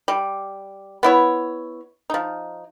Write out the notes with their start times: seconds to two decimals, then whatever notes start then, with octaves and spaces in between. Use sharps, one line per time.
0.08 G3
1.03 B3 E4 C#5
2.10 F3 D#4